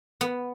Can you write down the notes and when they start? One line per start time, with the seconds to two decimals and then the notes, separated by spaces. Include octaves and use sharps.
0.21 B3